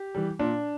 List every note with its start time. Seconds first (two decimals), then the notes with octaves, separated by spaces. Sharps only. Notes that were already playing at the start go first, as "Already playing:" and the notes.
Already playing: G4
0.15 E3 G3
0.39 A#2 D4